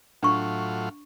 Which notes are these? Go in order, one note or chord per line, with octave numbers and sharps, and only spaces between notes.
A2 F#3 D4 F4 C#6